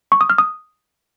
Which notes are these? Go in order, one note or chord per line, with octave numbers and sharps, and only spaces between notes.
C#6
D#6
F6
D#6